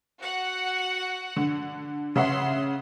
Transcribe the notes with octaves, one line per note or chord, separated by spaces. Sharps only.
F#4 F#5
D3
C#3 E5 F#5 C6